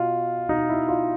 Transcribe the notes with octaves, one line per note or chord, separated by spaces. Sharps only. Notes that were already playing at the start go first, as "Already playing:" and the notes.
Already playing: B2 F4
B2 D#4
E4
F4